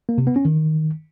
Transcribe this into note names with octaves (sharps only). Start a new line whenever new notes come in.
A#3
C3
B3
C#4
D#3